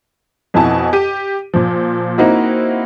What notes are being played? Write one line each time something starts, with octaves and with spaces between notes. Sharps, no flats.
F2 B2 E4 G#5 A5
G4 D#7
A#2 F3
A#3 C4 D#4 E4 F#4